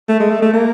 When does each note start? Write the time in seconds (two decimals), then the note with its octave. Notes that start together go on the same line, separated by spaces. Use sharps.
0.09 A3
0.20 G#3
0.31 A3
0.42 A3
0.53 A#3